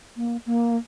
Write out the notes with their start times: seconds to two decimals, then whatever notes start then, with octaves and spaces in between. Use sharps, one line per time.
0.17 A#3
0.46 A#3